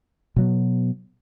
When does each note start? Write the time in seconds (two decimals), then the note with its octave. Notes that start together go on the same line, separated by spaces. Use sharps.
0.36 B2 F#3 B3